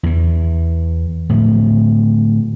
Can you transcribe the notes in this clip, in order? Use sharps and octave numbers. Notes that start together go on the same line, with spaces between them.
E2 E3
A2 D3 F3